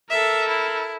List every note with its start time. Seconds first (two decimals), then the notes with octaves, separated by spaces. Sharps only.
0.10 A4 A#4 E5
0.49 E4